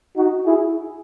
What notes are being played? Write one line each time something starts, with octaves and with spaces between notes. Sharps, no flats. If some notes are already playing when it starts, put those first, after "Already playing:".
D#4 F#4
E4 G#4